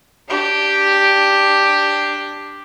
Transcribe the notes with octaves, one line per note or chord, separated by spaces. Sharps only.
D4 G4